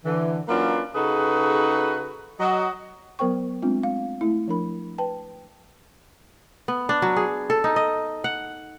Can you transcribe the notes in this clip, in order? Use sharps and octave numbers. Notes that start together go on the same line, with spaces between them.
D3 E3
F#3 A#3 C#4 D4 F4 B4
C#3 D#4 F#4 G#4 A4 B4
F#3 F#4 D#5
F#3 B3 A#4 C5 G5 C#6
G#3 A3 C4 D4 F4
F5
A3 E4
F3 D4 A#4 B5
B4 G5 A5
B3
D4
F#3
G#4
A4
D#4
D#5
F#5